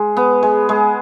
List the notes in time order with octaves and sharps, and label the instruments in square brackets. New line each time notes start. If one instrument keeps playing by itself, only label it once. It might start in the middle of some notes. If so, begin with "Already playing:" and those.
Already playing: [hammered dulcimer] G#3
B3
G#3
G#3